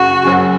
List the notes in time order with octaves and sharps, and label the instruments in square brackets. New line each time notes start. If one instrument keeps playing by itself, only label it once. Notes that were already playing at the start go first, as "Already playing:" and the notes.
Already playing: [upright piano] F#1 F#2 C#3 [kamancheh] F#4
[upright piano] F#1 F#2 C#3 F#3